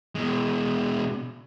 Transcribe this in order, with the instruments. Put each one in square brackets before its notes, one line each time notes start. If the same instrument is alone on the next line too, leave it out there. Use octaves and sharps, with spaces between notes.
[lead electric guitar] B2 G#3